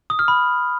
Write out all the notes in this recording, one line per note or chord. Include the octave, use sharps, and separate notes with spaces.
D#6
F6
B5